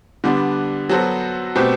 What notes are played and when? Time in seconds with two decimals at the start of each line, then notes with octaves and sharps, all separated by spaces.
0.24 D3 G3 B3 D4
0.89 F#3 B3 F#4 A4 C5
1.55 B2 A3 C4 G4 B4